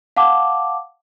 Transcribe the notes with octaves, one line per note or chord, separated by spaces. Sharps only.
F5 F#5 A5 D6